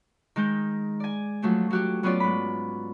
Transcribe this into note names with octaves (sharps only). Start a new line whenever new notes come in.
D#3 G#3 D#4 G6
D5 G#5
F3 F#3 A3 D4
F#3 F#4 G4
F#3 B3 C#4 F4 C#5 D5
G#2 B5